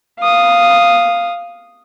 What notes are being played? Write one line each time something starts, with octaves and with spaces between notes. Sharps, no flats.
F5 D#6